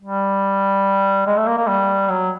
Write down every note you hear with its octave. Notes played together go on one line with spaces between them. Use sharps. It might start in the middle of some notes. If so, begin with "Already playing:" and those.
G3
G#3
A3
A#3
A#3
G3
F#3